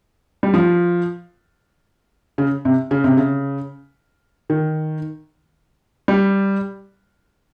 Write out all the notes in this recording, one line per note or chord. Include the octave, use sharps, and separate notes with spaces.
G3
F3
C#3
C3
C#3
C3
C#3
D#3
G3